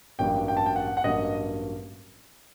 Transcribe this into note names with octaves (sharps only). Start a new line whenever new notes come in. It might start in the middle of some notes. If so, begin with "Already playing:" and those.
A1 G2 F#3 A#3 G5
G5
A5
G5
F#5
F#5
A1 G2 F#3 A#3 D#5